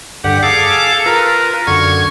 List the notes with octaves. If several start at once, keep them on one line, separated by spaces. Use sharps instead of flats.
G2 D3 G4 F#5
G#4 A4 F5 D6
F4 A#4 B4
F#2 D3 C#6 G#6